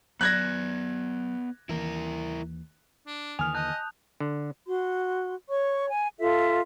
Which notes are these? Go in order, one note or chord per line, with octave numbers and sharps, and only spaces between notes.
F#3 B3 D5 F#6 G#6 A#6
D#2 E3 E4 A#4
D4
D#2 D3 E3 G#5 D#6 F6 F7
D#5 A5 F#6 G6
D3
F#4 C6
C#5 C#6
G#5
F4 A4 E5